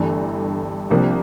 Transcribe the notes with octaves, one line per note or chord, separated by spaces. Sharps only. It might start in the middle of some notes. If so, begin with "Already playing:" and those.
Already playing: G1 G2 E3 A3 D4
C2 C3 F3 A#3 D4